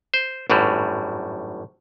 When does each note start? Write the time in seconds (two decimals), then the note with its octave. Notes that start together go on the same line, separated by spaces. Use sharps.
0.14 C5
0.50 G#1 F#2 A2 F#3 G3